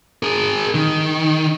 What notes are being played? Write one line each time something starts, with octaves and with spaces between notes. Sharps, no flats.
G#4 A#4
D#3